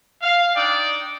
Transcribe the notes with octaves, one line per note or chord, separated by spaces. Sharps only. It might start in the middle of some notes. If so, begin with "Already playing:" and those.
F5
D4 D#4 D5 G5 D#6